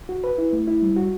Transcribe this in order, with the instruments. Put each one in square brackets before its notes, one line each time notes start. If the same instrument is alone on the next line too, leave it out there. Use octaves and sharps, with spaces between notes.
[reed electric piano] F#4
B4
E4
A3
E4
G3
F#4